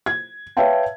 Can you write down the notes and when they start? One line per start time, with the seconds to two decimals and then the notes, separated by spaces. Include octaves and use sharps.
0.06 G#6
0.57 B4 C#5 E5 F5 G5 A5